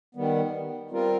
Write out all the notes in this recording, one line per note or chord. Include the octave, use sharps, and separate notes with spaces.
D#3 G3 B3
G3 C4 F4 A#4